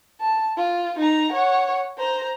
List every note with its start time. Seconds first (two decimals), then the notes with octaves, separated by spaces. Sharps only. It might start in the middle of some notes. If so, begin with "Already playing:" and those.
0.20 A5
0.57 F4
0.99 D#4 A#5
1.33 C#5 F#5
1.98 C5 A#5